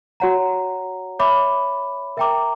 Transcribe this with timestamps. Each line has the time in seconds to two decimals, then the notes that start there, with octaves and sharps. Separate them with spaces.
0.20 F#4 C#5 F#5 A#5
1.19 C#5 E5 B5 D6
2.17 A#4 E5 G5 A#5 D6